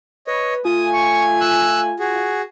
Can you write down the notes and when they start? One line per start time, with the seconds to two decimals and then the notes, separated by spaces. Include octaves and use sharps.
0.27 B4 C#5 D#5
0.65 A3 F4 G#5 D#6
0.94 C#6
1.41 E6 F#6
2.00 F#4 G#4